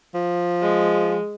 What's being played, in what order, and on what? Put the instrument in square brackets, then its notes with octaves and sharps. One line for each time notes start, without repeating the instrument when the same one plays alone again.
[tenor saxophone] F3
[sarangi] G#3